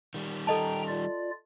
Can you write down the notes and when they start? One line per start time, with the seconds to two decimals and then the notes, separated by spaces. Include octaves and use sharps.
0.14 D#3 G3
0.47 A4 D#5 G5 A5 A#5
0.87 F4 D5